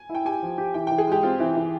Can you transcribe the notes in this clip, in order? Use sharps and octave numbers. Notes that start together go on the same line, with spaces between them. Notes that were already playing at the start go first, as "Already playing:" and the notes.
Already playing: G#5
E4
G5
G4 G#5
F3
G4
E3 G5
E3 G5
G#4
G#3 G4
C4 F4
E3
E3